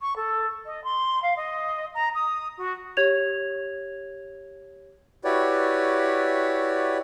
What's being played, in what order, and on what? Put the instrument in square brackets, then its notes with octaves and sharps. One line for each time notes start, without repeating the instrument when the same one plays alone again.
[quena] C#6
A4
D#5
C6
F5
D#5
A#5
D#6
F#4
[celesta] G4 C#5 G#6 F7
[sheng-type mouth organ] E4 F#4 G4 B4 C#5 D5